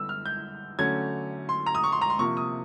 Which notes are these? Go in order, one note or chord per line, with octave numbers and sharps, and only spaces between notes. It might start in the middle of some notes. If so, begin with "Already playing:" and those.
Already playing: D3 G3 B3 E6
F6
G6
D3 F#3 A3 C#4 G#6
C6
A#5
D#6
C#6
C6
A#5
C6
C3 F3 A#3 C#6
D#6